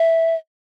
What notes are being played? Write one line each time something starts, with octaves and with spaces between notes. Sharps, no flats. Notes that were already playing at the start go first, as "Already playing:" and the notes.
Already playing: E5